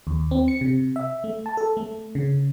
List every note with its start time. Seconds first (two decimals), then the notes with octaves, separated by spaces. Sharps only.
0.07 D#2
0.31 C4
0.48 C#7
0.61 C3
0.96 E5
1.24 A3
1.46 A5
1.57 A4
1.77 A3
2.15 C#3